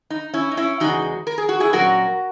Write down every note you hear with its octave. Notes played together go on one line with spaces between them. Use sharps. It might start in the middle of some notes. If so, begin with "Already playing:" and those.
D#4
C#4 E4
D#4
C#4 E4
E2 C#3 G#3 D#4 F#4
A#4
G#4
F#4
E4 G#4
A#2 F#3 C#4 F#4 A#4